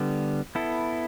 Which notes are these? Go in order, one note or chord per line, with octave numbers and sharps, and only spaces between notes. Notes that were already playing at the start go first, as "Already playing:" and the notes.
Already playing: D3 G3 B3
B3 E4 A4